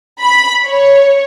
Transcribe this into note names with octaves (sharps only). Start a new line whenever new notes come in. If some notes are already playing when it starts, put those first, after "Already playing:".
B5
C#5